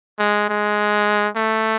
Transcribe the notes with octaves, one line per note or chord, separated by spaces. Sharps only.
G#3
G#3
A3